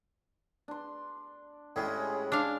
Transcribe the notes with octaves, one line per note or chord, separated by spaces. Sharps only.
D4 C6
A2 G3 G#3 C#4 G#4
D4 F5